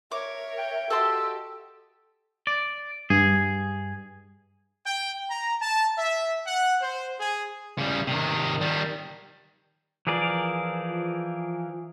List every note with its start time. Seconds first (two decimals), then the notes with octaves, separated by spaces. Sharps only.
0.12 A#4 C#5 E5 D6
0.58 G5
0.90 F#4 G4 A4 D#5 C6 E6
2.47 D5
3.10 G2 G#4
4.86 G5
5.30 A#5
5.61 A5
5.97 E5
6.46 F#5
6.80 C5
7.19 G#4
7.78 C#3 G3
8.07 C3 D#3
8.61 D#3 G3
10.07 E3 F3 G#4 A#4 D5